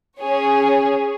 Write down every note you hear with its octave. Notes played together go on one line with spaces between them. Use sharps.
C#4 G#4 C#5